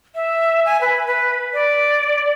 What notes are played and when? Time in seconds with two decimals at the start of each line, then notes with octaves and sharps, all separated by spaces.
0.15 E5
0.65 G#5
0.81 B4
1.07 B4
1.54 D5